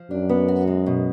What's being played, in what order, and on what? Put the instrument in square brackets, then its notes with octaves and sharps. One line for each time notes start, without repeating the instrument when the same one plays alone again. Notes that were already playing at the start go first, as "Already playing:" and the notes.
Already playing: [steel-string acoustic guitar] F3
[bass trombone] F#2 [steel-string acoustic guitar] D4
[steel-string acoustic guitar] B3
F#4
G#3
B2